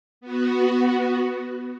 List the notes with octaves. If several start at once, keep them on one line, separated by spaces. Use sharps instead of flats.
B3 F#4